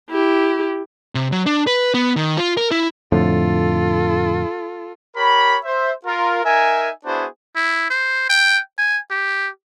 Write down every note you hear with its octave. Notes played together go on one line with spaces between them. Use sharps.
E4 G4
C3
F#3
D4
B4
B3
D#3
F4
A#4
E4
F2 A2 D3 F4 A4
G4 A#4 C#5 B5
C5 E5
F4 A#4
D#4 A#4 E5 G#5
B3 D4 E4 F#4 G#4 C5
E4
C5
G5
G#5
G4